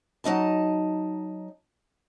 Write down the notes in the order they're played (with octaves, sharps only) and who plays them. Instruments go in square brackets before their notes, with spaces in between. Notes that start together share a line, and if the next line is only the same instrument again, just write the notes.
[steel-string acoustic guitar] F#3 D#4 D#5 A5